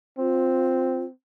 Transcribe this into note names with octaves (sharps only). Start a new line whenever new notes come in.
C4 F4